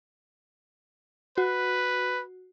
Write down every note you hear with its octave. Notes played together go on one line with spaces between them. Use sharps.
F#4 B4